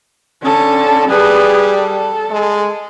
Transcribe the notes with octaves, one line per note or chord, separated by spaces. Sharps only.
D3 C#4 A4
G3 G#4 B4
A4
G#3